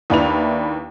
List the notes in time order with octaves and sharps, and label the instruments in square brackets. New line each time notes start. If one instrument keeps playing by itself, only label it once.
[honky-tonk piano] D#2 D4 E4 B4 F7